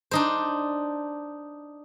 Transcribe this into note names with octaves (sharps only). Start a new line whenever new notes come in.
D4 D#4 C5